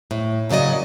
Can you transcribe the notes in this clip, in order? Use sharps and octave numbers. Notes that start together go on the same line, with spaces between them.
A2
A#2 C#3 F#3 D5 D#5